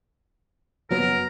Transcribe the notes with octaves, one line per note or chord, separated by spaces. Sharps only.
F#1 F#3 B3 A#4